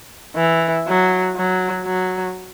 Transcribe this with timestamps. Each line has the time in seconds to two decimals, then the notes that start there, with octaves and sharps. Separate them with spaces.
0.36 E3
0.87 F#3
1.36 F#3
1.86 F#3